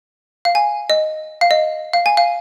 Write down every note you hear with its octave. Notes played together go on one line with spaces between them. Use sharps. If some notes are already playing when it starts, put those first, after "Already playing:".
F5
G#5
D#5
F5
D#5
F5
G#5
F5